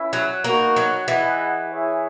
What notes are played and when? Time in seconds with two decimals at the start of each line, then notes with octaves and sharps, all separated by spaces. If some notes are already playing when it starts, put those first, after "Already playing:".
Already playing: C#4 E4 B4 E5
0.13 F#3
0.44 A#3 B3 D#4 F#4 A#4
0.76 F#3
1.08 E3 E4 G#4 B4 D#5 F#5
1.72 E4 G#4 C#5 E5